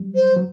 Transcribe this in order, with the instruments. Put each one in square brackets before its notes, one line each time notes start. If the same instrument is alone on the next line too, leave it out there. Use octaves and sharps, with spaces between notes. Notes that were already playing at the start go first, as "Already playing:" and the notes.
Already playing: [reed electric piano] F#3 G3
[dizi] C5
[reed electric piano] F#3